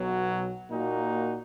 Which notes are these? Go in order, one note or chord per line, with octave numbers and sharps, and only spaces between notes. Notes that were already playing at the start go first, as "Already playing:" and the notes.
Already playing: B1 B2 F#3
A#2 A#3 D#4 F#4